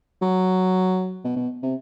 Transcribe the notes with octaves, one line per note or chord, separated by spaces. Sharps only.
F#3
B2
B2
C3